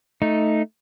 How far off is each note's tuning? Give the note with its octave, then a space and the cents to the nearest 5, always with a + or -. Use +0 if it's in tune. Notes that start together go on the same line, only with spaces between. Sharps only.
A3 +0 D#4 +0